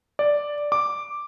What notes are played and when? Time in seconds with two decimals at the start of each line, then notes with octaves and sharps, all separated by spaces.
0.19 D5
0.72 D6